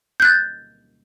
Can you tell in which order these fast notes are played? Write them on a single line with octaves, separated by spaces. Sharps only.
G6 F#6 A6